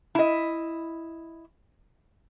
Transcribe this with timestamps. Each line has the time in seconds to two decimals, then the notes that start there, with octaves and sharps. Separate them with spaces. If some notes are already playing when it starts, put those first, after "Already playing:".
0.15 E4 D#5